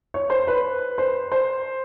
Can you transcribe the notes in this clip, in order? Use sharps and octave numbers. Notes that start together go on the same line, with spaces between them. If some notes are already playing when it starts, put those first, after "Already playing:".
C#5
C5
B4
C5
C5